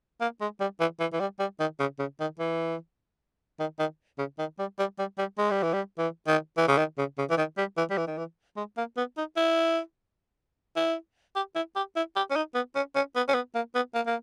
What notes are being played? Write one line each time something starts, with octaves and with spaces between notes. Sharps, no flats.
A#3
G#3
G3
E3
E3
E3
G3
G3
D#3
C#3
C#3
D#3
E3
D#3
D#3
C#3
D#3
G3
G3
G3
G3
G#3
G3
E3
G3
E3
D#3
E3
C#3
D#3
C#3
C#3
E3
D#3
G3
E3
G3
E3
D#3
E3
G#3
A#3
B3
D#4
E4
E4
G4
E4
G4
E4
G4
C#4
D#4
B3
C#4
C#4
B3
C#4
B3
A#3
B3
A#3
A#3